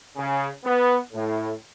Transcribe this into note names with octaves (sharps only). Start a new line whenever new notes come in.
C#3
B3
A2